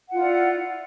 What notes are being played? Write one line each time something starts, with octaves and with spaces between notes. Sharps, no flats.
E4 F4 D5 F#5